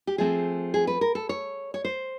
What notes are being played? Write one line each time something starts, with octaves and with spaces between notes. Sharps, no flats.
G4
F3 A3 C4 G#4
G#4
B4
A#4
A4
C#5
C#5
C5